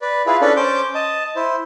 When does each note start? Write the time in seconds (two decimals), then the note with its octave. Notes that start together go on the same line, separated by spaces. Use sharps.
0.02 B4 D5
0.26 E4 F4 G#4 B4
0.41 C#4 D4 A4 B4 D5
0.56 C#4 C5 D6 G6
0.95 D#5 A5
1.36 E4 C5